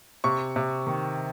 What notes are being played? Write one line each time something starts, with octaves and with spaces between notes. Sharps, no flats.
C3 C#6
C3
D#3